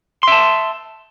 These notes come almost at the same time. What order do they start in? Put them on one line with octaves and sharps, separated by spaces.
C6 E5 A5